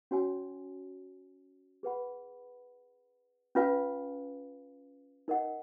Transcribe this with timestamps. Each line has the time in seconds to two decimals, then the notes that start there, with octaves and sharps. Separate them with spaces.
0.11 C#4 F#4 C#5 G#5
1.83 G#4 B4 F#5 B5
3.55 C#4 F4 B4 F5 G#5
5.28 D#4 A#4 D#5 F#5